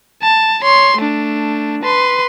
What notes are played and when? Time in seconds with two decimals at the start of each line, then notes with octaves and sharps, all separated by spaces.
0.22 A5
0.62 C#5 C6
0.98 A3 D4
1.83 B4 C6